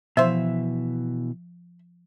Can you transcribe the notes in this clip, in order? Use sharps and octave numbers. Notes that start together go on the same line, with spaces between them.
B2 E3 F3 C5 E5